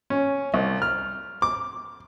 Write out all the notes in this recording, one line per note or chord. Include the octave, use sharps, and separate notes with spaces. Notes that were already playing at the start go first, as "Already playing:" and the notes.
C#4
C2
F6
D6